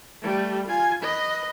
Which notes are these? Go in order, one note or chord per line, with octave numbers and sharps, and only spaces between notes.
G3 A3
F4 G#5
B4 D#5